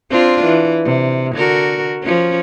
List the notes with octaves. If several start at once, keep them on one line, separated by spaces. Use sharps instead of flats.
C4 D4 F4
E3
C3
D3 F#4 A#4
F3 C#4